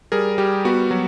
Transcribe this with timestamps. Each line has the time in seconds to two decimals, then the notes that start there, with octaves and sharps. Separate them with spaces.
0.12 G3 G#4 A#4
0.38 G3 G4
0.65 B3 F#4
0.91 F#3